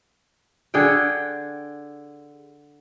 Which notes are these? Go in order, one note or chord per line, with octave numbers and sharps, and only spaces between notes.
D3 G#4 F#5 G5